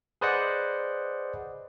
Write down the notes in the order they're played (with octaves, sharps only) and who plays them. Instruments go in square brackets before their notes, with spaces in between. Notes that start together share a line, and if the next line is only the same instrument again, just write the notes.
[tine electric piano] G#4 B4 C5 D5 D#5 F#5